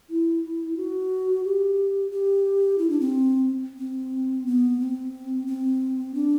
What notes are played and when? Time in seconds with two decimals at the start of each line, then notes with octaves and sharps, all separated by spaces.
0.10 E4
0.77 F#4
1.44 G4
2.11 G4
2.78 E4
2.90 D4
3.00 C4
3.79 C4
4.46 B3
4.80 C4
5.47 C4
6.15 D4